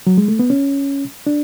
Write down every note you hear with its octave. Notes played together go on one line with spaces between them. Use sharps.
F#3
G#3
A3
B3
C#4
D4